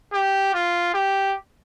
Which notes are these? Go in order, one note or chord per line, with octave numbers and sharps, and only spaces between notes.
G4
F4
G4